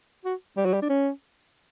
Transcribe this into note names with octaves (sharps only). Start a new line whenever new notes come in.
F#4
G3
F#3
G3
D4
C#4